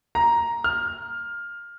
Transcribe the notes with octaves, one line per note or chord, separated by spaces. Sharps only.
A#5
F6